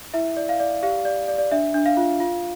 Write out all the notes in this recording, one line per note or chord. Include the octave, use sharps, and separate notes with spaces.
E4 E5
D5
F5
D5
G4 F5
D5
D5
D5
D4 E5
D4
F5
F4
F4